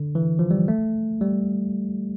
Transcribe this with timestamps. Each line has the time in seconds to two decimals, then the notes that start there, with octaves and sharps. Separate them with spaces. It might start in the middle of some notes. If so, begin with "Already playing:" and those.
Already playing: D3
0.15 E3
0.39 F3
0.51 G3
0.68 A3
1.21 G3